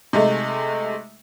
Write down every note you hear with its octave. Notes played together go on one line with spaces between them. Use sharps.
C3 G#3 A3 D#4